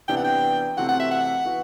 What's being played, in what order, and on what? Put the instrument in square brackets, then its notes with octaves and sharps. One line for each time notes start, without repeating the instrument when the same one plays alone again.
[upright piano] C3 E3 B3 D4 [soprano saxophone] G5
[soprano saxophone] F#5
G5
[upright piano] C3 E3 A3 C4 F#4 [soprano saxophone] F#5
[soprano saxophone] F#5
E5
F#5
[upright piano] E3 B3 F#4